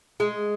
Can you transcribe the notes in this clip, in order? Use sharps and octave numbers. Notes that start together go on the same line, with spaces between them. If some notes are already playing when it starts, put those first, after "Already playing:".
G#3